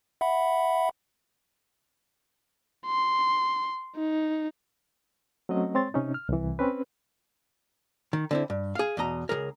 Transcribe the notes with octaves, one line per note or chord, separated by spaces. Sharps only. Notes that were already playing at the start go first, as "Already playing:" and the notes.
E5 F#5 B5
C6
D#4
F#3 A3 C4 C#4 D#5
G#3 C4 C#5 C6 A6
C3 C#4 D#4
F6
C2 E3
C4 C#4 B4
D#3
D3 C4 E4
G2
G#4 F5
E2 B2 D#5 A#5
C#2 C#3 G#4 A#4